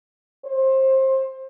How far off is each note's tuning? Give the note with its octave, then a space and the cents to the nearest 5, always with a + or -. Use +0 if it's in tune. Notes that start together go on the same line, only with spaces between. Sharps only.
C5 +25